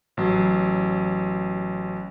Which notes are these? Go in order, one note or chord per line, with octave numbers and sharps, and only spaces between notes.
A1 F#3